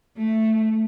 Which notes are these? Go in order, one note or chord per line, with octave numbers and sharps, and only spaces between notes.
A3